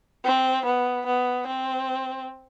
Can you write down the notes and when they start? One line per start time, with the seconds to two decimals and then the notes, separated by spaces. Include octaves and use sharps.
0.25 C4
0.66 B3
1.07 B3
1.47 C4